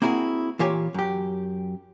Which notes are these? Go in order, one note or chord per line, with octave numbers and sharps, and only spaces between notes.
A#3 C4 E4 F#4 G#4
A#2 E3 F4 G4 C#5 G#5
F#2 G4